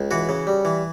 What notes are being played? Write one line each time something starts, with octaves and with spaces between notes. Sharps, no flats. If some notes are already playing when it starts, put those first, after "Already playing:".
Already playing: C#2
E3 F#4
C#3
G3
E3